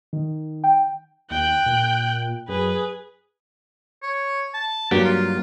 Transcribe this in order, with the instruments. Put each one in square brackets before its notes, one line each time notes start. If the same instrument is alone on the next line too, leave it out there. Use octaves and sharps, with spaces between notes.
[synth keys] D#3
G5
[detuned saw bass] D#2 [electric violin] G5 F#6
[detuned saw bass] A#2
[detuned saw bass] F#2 [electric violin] G#4 B4
[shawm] C#5
A5
[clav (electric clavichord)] G2 F#3 A#3 [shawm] G4
[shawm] F4